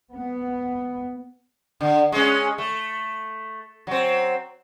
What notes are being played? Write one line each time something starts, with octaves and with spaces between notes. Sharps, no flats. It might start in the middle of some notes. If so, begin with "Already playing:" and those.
B3
D3
G#3 C#4
A3
F#3 C4